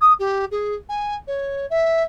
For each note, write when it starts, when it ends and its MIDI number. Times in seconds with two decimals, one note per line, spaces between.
0.01 0.13 87
0.19 0.45 67
0.51 0.74 68
0.89 1.15 80
1.27 1.66 73
1.70 2.03 76